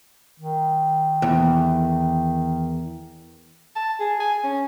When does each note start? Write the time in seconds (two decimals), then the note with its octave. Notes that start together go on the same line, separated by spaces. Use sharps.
0.40 D#3
1.22 E2
3.76 A5
3.99 G#4
4.20 G#5
4.43 C#4